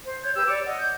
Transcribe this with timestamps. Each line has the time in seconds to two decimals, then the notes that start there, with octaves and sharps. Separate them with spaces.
0.04 C5
0.24 C#5 G6 G#6
0.36 G4 B4 E6 G6
0.48 C#5 D5 D6
0.66 D#5 F#5
0.79 G6